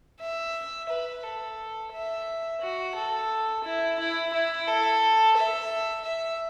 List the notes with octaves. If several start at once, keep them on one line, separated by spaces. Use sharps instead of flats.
E5
B4
A4
E5
F#4
A4
E4
E4
E4
A4
E5
E5